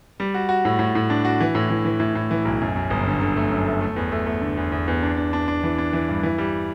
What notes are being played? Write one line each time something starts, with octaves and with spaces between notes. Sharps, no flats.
G3
F#4
F#4
A2
A2
A2
D4
F#4
E3
A2
E3
E3
A2
A2
E3
B1
F#2
F#2
G1
D3
D3
A3
F#2
A3
A3
E2
A3
A3
D3
E2
E2
E2
D4
D4
D4
D4
E3
D4
E3
G2
E3
G3